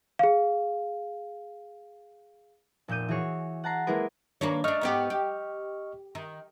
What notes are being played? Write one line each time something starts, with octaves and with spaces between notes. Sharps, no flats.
G#4 F5
F1 A#2 E6 G6 D#7
E3 F#4 G#4 C#5
F#5 A5 A#5 C7
G#3 A#3 E4 G#4 A#4 B4
D#3 A#3 D4 B4 C#5
A3 D4 D#5 C#6 F6
G#2 B3 G4
G4
D#3